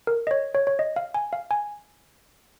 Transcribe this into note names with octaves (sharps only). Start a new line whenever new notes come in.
A#4
D#5
C#5
C#5
C#5
D#5
F5
G#5
F5
G#5